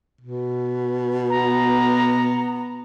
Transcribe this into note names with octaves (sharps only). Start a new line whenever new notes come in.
B2
B3 A#5